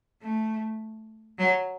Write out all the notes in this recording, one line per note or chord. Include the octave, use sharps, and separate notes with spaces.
A3
F#3